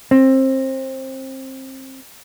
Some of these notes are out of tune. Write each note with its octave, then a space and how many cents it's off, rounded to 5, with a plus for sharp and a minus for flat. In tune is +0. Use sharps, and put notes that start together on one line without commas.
C4 +25